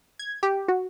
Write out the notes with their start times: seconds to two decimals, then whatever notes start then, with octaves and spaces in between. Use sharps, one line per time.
0.19 G#6
0.43 G4
0.68 F#4